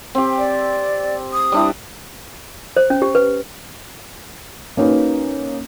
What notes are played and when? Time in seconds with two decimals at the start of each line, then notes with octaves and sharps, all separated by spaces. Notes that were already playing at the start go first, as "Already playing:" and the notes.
0.15 C4 G4
0.38 D5
1.33 D#6
1.52 G3 D4 E4
2.77 C5
2.90 C#4
3.02 G4
3.15 B4
4.77 A#3 C#4 D#4 F#4 B4